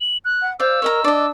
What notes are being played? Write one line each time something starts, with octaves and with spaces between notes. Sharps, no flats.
F#7
F#6
F#5
C5 D5 F5 E6
A#4 C#5 D#5 A#5
D4 D5 D#5